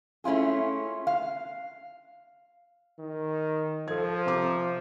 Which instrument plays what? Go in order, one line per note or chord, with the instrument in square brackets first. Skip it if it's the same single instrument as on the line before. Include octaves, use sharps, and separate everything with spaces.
[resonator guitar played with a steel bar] A3 C#4 E4 F4 G#4
F5
[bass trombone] D#3
[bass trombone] F3 [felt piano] A4 G#6
[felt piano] C3 A#5 D6